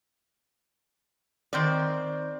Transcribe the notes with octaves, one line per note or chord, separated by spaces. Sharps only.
D#3 C4 D5